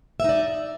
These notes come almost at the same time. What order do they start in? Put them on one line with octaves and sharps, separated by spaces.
E5 D#4 D5